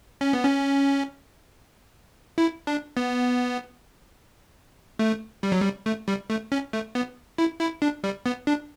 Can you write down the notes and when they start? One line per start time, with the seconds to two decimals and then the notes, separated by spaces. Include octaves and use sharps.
0.21 C#4
0.33 B3
0.44 C#4
2.38 E4
2.67 D4
2.97 B3
4.99 A3
5.43 G3
5.52 F#3
5.61 G3
5.86 A3
6.08 G3
6.30 A3
6.52 C#4
6.73 A3
6.95 B3
7.38 E4
7.60 E4
7.82 D4
8.04 G3
8.26 B3
8.47 D4